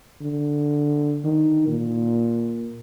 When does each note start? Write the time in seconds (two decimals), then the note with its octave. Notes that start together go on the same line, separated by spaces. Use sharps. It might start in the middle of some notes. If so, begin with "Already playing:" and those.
0.21 D3
1.24 D#3
1.68 A#2